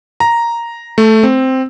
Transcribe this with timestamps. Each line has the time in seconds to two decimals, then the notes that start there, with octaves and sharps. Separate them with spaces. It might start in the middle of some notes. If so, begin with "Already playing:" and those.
0.20 A#5
0.98 A3
1.23 C4